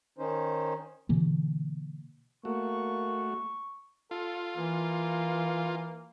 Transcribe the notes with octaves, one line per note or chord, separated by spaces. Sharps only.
D#3 C#4 D#4 C5
B2 D3 E3 A#3
A3 A#3 F#4 C#6
F4 A4
E3 A#3